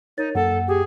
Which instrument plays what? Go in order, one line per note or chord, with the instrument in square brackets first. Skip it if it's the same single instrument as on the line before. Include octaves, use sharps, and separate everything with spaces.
[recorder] D#4 [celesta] A#4 C#5 A6
[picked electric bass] F#2 A#3 [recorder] A4 [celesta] F#5
[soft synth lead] G4 [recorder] G#4